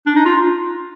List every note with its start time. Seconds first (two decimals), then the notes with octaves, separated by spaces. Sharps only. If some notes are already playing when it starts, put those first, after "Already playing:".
0.06 D4
0.16 D#4
0.25 F4